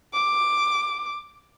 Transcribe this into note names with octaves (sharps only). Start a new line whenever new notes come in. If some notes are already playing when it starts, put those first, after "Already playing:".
D6